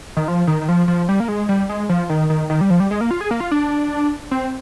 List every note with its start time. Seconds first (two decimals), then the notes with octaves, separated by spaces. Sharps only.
0.17 D#3
0.28 F3
0.47 D#3
0.61 D#3
0.69 F3
0.88 F3
1.09 G3
1.20 A#3
1.28 G#3
1.49 G3
1.69 G#3
1.89 F3
2.10 D#3
2.30 D#3
2.50 D#3
2.61 G3
2.70 F3
2.80 G3
2.91 G#3
3.01 A#3
3.11 F4
3.21 G#4
3.31 A#3
3.40 F4
3.51 D4
4.31 C4